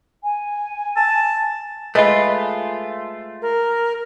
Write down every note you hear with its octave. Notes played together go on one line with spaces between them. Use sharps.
G#5
A5
G#3 A3 F4 B4 D#5
A#4